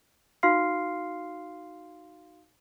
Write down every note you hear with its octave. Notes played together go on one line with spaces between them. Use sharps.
D#4 F#4 F5 C6 F6 C7